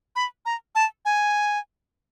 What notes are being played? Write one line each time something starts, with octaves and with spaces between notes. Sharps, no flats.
B5
A#5
A5
G#5